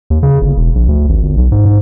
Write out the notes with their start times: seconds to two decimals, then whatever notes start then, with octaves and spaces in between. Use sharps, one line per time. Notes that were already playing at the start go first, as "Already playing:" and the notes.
0.10 D#2
0.23 C#3
0.42 G1
0.56 E1
0.75 A#1
0.89 D2
1.09 G#1
1.23 G1
1.37 B1
1.52 G#2
1.65 G#2